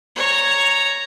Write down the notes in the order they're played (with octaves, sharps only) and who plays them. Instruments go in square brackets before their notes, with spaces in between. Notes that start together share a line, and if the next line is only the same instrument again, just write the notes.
[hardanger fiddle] C#5 A#5